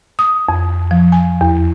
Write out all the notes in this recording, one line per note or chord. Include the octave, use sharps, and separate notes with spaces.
D#6
F2
F3
G#5
E2